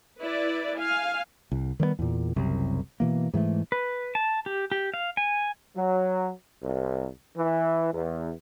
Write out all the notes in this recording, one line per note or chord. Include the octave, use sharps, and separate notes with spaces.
E4 B4 D5
F5 G#5
C2
D#3 G3 A3 B3
E2 A#2
F#1 C2 F#2 C3
B2 E3 A#3
G#2 E3 F3 A3
B4
A5
G4
G4
F5
G#5
F#3
C2
E3
E2